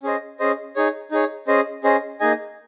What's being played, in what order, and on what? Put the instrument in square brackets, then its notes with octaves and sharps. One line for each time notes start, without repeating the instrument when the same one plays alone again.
[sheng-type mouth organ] C#4 G#4 C5 D#5
C#4 G#4 C5 D#5
D#4 G#4 C#5
D#4 G#4 C#5
C#4 G#4 C5 D#5
C#4 G#4 C5 D#5
A#3 D#4 G#4 D#5 G#5